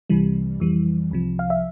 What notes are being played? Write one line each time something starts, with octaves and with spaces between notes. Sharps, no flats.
C2 C3 E3 G3
F2 E3 G3
C2 C3 F3
F5
E5